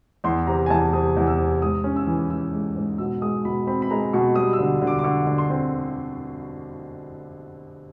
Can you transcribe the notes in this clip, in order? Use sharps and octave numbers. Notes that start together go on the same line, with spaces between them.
E2 C6
C3 A#5
G#5
E2 A5
C3 D#6
E2
E6
C3
G#2 D#6
C#4
E6
E3
E3 E6
G#3
G#2
B2 E6
G#3 D#6
B2 B5
C4 B5
B5
G#3 A#5
B2 C#6
G3 D#6
E6
D3
D3
D6
D6
D3 C#6
D3
C6
C4